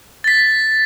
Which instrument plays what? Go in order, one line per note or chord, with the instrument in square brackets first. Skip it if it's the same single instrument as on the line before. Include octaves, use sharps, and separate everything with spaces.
[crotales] A6 B6